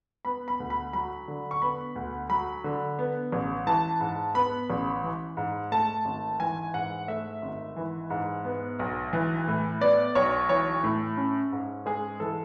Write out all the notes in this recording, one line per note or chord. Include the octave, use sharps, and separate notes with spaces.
B3 B5
B5
D2
B5
F#3 B5
D3
C#6
B3 B5
D2
F#3 B5
D3
B3
A1
E3 A5
G#2
B3 B5
A1
E3
G#2
A3 A5
G#1
E3 G#5
G#2 F#5
A3 E5
G#1
E3
G#2
B3
B1
E3
A2
B3 D5
B1 C#5
E3 C#5
A2
C#4
G#2
G#3 G#4
E3 A4